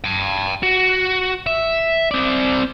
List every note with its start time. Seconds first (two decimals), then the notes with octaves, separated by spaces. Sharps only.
0.04 G5 A5
0.63 F#4
1.46 E5
2.11 C4 D5